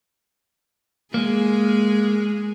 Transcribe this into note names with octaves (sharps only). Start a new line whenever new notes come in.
G#3 A#3 G#4